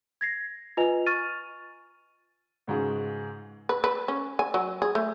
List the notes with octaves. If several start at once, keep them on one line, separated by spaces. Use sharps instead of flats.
G#6 A#6 C7
F4 B4 D#5 G#5 F7
C#6 F6 A6 D#7
C#2 G#2 F#4 G#4
B4
B4
C#4
G#5
F#3
G#4
A3